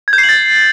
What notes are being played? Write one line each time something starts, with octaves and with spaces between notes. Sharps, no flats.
G#6
G6
C7
F#7
A6